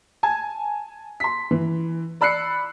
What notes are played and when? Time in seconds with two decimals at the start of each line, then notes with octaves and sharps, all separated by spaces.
0.23 G#5 A5 G#6
1.20 C6 B6
1.51 E3
2.21 D5 B5 E6 F#6 C7 C#7